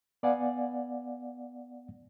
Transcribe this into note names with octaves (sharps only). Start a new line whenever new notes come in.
B3 D5 F5 F#5 G#5